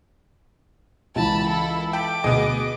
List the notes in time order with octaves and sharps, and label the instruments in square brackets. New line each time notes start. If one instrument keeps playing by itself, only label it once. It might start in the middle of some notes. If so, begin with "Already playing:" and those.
[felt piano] C#2 E3 [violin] A5 B5
[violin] E4 A4
[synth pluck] A4 B5 [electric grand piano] G5 [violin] D6
[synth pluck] D2 B2 [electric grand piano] B3 D#5 [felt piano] G#4